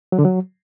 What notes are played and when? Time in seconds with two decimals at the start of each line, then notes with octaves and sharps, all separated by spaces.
0.12 F#3
0.19 D3
0.25 F#3